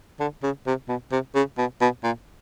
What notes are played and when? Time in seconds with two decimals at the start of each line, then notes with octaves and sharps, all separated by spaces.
0.20 D3
0.43 C#3
0.67 C3
0.89 B2
1.12 C3
1.35 C#3
1.58 B2
1.81 B2
2.04 A#2